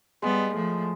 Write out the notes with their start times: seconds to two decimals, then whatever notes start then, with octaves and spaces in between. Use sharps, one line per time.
0.22 G3 G#3 B3
0.54 A2 F3